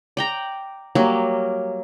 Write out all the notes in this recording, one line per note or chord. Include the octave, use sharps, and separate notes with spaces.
D5 G5 A#5
F#3 G3 A#3